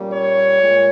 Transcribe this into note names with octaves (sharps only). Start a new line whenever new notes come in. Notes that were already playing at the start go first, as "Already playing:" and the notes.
Already playing: A#2 G3 A#3 C#4
C#5
A#2 G#3